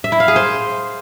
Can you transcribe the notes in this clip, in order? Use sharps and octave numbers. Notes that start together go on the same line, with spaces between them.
E5
E4
F5
G#4
C5